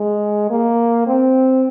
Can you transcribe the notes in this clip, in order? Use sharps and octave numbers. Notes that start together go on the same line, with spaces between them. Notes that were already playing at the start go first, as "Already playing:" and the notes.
Already playing: G#3
A#3
C4